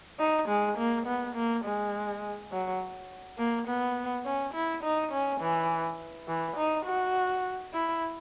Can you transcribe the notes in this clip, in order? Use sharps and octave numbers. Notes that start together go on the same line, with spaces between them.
D#4
G#3
A#3
B3
A#3
G#3
F#3
A#3
B3
C#4
E4
D#4
C#4
E3
E3
D#4
F#4
E4